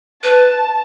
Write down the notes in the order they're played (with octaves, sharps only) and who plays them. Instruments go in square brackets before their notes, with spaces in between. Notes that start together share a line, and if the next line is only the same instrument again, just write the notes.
[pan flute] B4 [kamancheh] A5